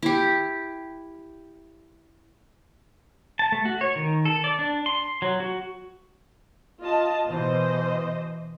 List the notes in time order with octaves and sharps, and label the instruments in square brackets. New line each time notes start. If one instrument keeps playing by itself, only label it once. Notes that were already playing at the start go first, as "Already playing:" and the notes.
[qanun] E4 G4
[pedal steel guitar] A5
A3
F#4
C#5
D#3
A4
D5
D4
C6
F#3
F#4
[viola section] F4 D#5 A5
[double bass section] B2 E3 [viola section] C5 D#5